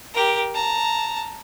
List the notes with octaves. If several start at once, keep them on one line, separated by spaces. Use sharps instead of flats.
G4 A#4
A5 A#5